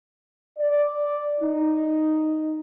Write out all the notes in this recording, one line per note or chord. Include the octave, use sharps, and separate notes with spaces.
D5
D#4